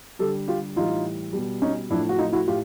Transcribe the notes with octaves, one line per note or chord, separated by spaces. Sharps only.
D3 G3 G4 A4
F4 G4
A2 E3 G3 D#4 F4
B2 G3
C#4 D#4
A2 F3 A3 D4 E4
F#4
D#4 F4
E4 F#4
A2 F4 G4